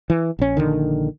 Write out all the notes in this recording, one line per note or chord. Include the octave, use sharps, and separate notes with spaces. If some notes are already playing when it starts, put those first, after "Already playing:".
E3
A#1 C#4
A#1 A#2 D3 D#3